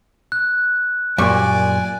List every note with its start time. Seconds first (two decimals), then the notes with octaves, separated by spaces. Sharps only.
0.32 F#6
1.18 F#2 A#2 G3 A#3 D5 G#5 C#6